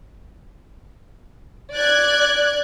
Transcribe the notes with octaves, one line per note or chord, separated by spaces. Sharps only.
D5 F#6 G#6